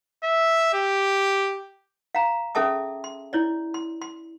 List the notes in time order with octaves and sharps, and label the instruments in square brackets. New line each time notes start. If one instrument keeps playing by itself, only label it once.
[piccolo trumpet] E5
G4
[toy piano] F5 A#5
C#4 G#4 A4 E5 A5 D6
C6
E4 C#5 D5
C6
C6